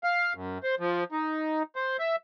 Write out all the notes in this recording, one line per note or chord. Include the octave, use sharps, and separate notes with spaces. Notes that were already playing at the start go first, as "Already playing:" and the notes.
F5
F#2
C5
F3
D#4
C5
E5